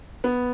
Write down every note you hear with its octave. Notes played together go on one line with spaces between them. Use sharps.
B3